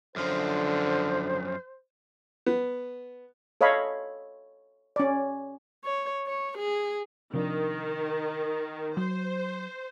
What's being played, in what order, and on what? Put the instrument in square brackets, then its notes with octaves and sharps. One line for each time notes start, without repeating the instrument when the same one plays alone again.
[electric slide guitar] F#2 F3 [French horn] D3 [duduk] C5
[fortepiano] B3
[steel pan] A4 C#5 D#5 F5 B5
C#4 D5
[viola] C#5
C#5
G#4
[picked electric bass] C3 F3 D4 [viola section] D#3
[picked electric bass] F#3 [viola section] C5